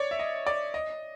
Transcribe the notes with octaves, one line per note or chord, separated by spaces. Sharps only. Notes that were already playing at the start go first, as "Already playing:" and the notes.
Already playing: C#5 D5
E5
D#5
D5
D#5